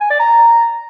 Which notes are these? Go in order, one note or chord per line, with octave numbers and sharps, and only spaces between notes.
G#5
D5
A#5